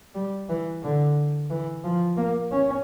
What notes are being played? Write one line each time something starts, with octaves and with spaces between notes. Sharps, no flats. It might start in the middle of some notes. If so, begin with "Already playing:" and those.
G3
E3
D3
E3
F3
A#3
C#4